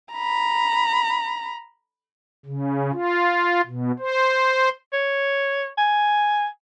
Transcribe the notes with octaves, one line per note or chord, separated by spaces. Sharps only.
A#5 B5
C#3
F4
B2
C5
C#5
G#5